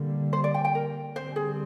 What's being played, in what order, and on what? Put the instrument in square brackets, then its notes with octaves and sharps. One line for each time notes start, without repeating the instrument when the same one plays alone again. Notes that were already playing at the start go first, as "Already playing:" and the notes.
Already playing: [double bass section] D3 G3 A#3
[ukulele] C5
D5
G5
G5
A#4
[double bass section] D3 G3 C4 [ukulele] C5
[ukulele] G#4